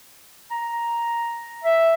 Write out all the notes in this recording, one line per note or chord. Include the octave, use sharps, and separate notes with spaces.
A#5
E5